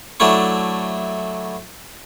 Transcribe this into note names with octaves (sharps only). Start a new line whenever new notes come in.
F#3 A3 D4 E4 C#6